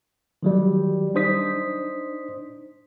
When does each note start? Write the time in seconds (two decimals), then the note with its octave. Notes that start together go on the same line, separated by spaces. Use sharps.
0.43 D#3 F#3 G3
1.15 D4 D#4 C5 D#6 B6